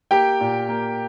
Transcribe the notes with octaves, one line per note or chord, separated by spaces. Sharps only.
A#3 G4 G5
A#2
A#3